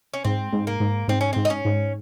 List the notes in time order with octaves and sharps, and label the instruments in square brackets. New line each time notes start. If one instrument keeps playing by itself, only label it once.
[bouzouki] C#4
[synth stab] G#2 [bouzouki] C4
[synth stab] G#2
[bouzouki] A#3
[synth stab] G#2
[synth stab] G#2 [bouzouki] C4
[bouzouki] C#4
[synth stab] G#2 [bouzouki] C4
[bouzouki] D#4
C#4
[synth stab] G#2